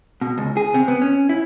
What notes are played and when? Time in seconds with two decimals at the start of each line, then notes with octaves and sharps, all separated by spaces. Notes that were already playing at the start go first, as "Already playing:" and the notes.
0.21 B2
0.38 C#2
0.57 G#4
0.74 C3
0.88 B3
1.02 C#4
1.29 E4